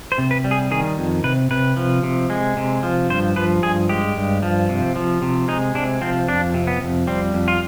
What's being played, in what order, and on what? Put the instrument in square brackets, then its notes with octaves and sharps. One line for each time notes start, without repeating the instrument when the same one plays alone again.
[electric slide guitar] C5
C3
B4
G3
G#4
D#3 G#4
F2
C3 B4
C3 B4
F3
C3
G#3
C3
F3
G2 C5
F3 B4
G2 G#4
G#3 G4
G2
F3
C3
F3
C3
G#3 D#4
C3 D4
F3 C4
F2 D4
C3
B3
F2
G3 C4
F2
F4